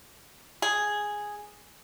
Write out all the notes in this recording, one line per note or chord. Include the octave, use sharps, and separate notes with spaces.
G#4